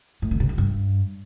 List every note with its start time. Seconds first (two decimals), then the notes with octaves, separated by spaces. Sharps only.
0.22 A2
0.31 D3
0.40 C3
0.49 D3
0.58 G2